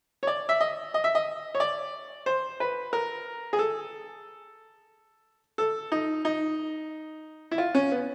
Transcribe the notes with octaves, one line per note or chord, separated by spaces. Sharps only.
C#5
D5
E5
D#5
D#5
E5
D#5
C#5
D5
C5
B4
A#4
G#4
A4
A4
D#4
D#4
E4
F4
C#4
B3